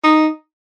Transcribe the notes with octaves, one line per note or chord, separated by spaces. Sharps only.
D#4